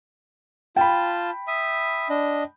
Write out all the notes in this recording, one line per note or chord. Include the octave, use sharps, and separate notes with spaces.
F4 G5 A5 B5
E5 D#6
D4 D#5